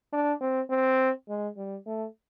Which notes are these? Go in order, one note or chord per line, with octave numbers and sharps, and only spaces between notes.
D4
C4
C4
G#3
G3
A3